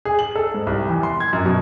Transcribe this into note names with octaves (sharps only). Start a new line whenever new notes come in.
G#4
F#7
A4
G#2
C2
E2
C6
G#6
F#2
B2